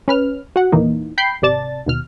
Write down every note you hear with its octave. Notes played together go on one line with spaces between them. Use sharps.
C#4 B4 F6
F#4 F#5
E2 A#2 E3 A#3 D#4
G5 B5 G6 C7
G#1 C3 D5 A5 A6
D#2 B2 F6